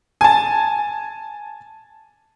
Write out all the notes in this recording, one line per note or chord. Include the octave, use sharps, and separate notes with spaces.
G#5 A5